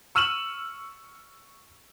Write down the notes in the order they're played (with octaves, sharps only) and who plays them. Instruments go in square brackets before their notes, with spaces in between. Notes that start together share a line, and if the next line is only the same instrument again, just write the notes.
[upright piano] C#6 E6 F6 D#7 E7 F#7